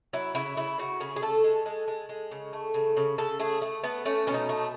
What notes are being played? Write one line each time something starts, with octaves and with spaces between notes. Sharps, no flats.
F#3 E4
C#3 E4
C#3 E4
C#3 F#4
C#3 G#4
G#4
A3 A4
G#3
G#3
G#3
G#3
C#3
A3
C#3
C#3
C#3 A4
A3 G#4
A3
A3 B3
A3 C#4
B2 C#4
D#4
A3